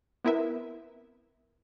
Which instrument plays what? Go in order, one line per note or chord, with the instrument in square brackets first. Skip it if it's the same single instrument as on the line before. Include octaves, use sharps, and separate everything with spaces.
[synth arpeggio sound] B3 C4 E4 A#4 B4 E5